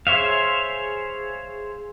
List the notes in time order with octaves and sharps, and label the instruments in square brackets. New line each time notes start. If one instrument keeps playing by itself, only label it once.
[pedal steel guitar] G#4 C5 C#5 E5 F5